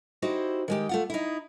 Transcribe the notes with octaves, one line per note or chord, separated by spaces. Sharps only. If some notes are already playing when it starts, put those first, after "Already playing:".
D#4 E4 F#4 G4 C5
D#3 G#3 G4
A3 F4 F#5
D#4 E4